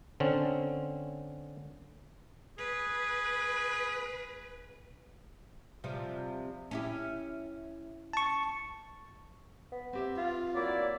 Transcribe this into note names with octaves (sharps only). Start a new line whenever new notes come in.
D3 C4 C#4
G#4 B4
C3 F3 G3
C#4 E4 G4
A5 C#6
B3
C4 G4 E5
F4
F#3 A#3 E4 D5